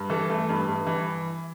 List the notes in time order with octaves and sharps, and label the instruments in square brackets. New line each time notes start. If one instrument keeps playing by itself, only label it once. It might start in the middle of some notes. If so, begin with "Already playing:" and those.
Already playing: [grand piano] G2
E3 A4
A3
G2
G2
E3